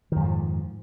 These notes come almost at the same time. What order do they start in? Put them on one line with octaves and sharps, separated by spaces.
D#3 F2 G#2 F3